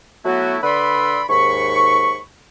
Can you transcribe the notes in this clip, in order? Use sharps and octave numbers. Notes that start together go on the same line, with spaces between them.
F#3 A3 B3 E4 F#4
D3 B4 D5 B5 C6 E6
D#2 G#2 B5 C#6